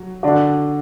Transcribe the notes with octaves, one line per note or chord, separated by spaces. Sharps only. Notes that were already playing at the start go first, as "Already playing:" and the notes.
Already playing: F#3
D3 D4 F#4